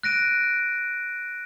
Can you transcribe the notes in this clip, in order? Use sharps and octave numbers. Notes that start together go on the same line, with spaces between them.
F#6 A#6 D7 D#7